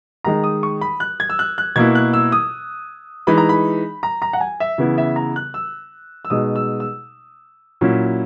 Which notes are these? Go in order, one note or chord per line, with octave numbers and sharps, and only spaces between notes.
D#3 G#3 D#4 A#5
D#6
C#6
B5
F#6
G#6
E6
F#6
F#6
B2 A#3 E4 G#6
F#6
E6
D#6
E3 G#3 D#4 B5
A#5
B5
A#5
A#5
F#5
G#5
E5
C#3 E3 B3 E4
E5
A#5
F#6
E6
E6
B2 G#3 D#4 D#6
E6
E6
A#2 F#3 C#4 E4